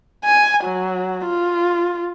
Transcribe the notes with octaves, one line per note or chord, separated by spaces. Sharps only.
G#5
F#3
F4